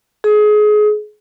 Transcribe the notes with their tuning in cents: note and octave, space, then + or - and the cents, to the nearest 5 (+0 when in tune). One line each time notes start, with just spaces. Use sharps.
G#4 +25